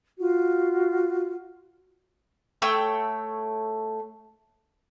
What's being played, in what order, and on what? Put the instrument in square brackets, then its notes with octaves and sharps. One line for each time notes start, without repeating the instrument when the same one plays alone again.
[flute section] F4 F#4
[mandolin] A3 C#5 G5 E6